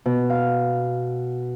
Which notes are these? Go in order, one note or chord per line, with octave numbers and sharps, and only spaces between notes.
B2
F5